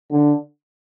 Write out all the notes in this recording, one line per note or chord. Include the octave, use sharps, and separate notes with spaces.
D3